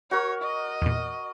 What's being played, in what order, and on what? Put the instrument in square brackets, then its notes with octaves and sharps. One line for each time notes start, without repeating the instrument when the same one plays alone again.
[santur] F#4 A#4 [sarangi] C#5
[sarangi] D#5
[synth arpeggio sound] E2 A#2